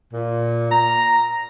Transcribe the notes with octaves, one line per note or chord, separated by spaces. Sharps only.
A#2
A#5